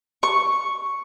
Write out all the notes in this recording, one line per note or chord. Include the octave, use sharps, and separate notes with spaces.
C#6